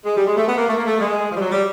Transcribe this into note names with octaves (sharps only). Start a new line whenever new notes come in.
G#3
G3
G#3
A3
B3
A#3
A3
A#3
A3
G#3
F3
G3
F#3
G3